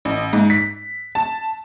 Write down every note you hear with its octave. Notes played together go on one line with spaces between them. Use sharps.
A1
G#2
B6
A5